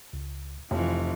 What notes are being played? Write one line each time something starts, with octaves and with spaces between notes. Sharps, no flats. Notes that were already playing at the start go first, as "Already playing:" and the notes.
C#2
F1 F2 E3 F3